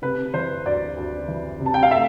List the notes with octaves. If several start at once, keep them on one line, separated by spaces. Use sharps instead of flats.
C3 B4
E3 C5
D2 D5
D2
E3
C3
A5
G5
F5
A3 E5